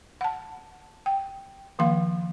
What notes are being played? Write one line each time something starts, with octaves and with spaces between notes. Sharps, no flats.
F#5 A5
G5
D#3 F3 A#3 F5 C6